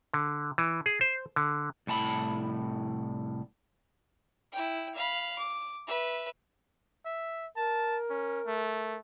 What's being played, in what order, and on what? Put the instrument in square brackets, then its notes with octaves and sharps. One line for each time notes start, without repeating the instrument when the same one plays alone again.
[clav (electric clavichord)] D3
E3
G#4
C5
D3
[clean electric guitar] C2 A2 A5 B5
[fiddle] E4 G5
F5 B5
D6
B4 E5
[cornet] E5
[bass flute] A#4 [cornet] A5
[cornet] C#4
A3